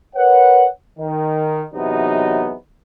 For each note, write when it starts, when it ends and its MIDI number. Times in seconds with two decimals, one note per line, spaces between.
0.16 0.67 70
0.16 0.67 71
0.16 0.67 73
0.16 0.67 78
0.99 1.64 51
1.74 2.54 40
1.74 2.54 48
1.74 2.54 54
1.74 2.54 59
1.74 2.54 63
1.74 2.54 75